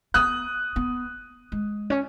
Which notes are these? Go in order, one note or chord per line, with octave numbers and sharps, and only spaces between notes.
B3 D#6 F#6
B3
G#3
C#4